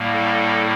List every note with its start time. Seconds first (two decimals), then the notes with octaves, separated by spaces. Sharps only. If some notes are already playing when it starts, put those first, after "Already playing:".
Already playing: A2 G3 A#3
0.13 A4